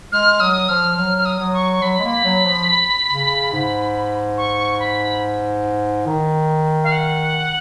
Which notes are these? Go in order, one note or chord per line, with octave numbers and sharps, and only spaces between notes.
G#3 F6
F#3 D#6
F3 F6
F#3 F6
F6
D#6
F#3
C#6
C#6
F#3 B5
G#3
A#3
F#3
F3
C#3
G#2
C#6
B5
D#3
F5
F#5